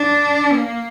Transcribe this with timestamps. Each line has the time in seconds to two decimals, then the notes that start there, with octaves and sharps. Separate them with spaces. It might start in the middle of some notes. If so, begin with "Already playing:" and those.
Already playing: D4
0.52 A#3